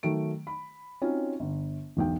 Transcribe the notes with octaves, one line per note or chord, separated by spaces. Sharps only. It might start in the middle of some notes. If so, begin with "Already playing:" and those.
D#3 F#3 A3 D7
B5
C4 C#4 D#4 F4 F#4
G1
E1 B1 G5